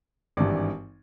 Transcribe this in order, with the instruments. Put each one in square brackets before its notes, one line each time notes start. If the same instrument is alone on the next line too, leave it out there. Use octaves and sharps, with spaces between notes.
[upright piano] G#1 G2 E3 D5